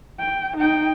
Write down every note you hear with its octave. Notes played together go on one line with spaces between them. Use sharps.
G5
D#4 G5